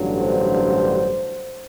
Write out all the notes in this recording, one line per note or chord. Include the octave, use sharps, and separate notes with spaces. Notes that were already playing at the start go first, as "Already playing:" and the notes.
Already playing: A1 G2 D3 F#3
C5